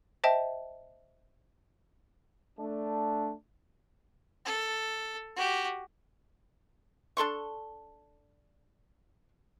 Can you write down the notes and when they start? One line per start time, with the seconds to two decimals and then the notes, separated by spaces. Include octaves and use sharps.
0.24 C5 D#5 E5 G5 A5
2.59 A3 D4
4.45 A4
5.36 F#4 G4
7.17 D4 A4 C6 C#6